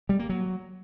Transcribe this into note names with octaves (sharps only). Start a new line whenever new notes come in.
G3
A#3
F#3